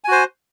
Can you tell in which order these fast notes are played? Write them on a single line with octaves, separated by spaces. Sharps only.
G#5 F#4 C5